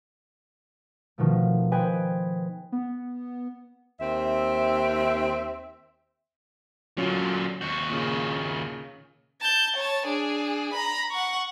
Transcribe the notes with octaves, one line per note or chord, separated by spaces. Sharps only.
B2 D#3 F3 A3
B4 C5 D#5 G5 G#5
B3
D#2 C4 E5
A#2 D3 F#3 C#4 F4
D#2 F#4 G6
A#2 C#3
A5 G6
C#5 A5
D4 G#4
A#5 B5
F#5 C#6